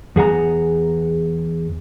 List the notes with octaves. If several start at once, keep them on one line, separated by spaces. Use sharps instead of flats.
E2 G#4 F#5 A#5